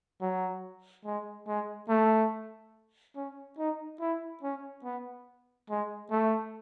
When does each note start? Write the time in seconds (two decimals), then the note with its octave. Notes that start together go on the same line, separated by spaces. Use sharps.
0.21 F#3
1.05 G#3
1.47 G#3
1.89 A3
3.16 C#4
3.58 D#4
4.00 E4
4.43 C#4
4.84 B3
5.70 G#3
6.11 A3